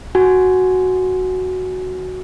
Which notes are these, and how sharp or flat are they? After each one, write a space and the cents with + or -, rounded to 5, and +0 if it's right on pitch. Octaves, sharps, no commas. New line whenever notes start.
F#4 +0 G#5 +10